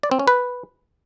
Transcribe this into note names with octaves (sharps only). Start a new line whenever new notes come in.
D5
C4
C#4
B4